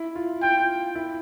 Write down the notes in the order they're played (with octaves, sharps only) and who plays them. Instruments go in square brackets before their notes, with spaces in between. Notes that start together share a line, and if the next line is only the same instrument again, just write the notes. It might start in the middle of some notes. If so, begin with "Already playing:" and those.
Already playing: [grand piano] E4
F4
[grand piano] F4 [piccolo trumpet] G5
[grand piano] E4